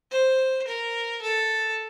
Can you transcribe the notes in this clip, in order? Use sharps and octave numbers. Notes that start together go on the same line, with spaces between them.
C5
A#4
A4